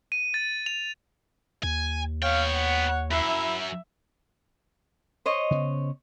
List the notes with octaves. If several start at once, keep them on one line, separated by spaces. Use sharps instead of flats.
D#7
A6
F7
D#2 G#5
B3 C#5 F5 G5
F#5
F#2 E4 E5
C5 C#5 D#5
C#3 B3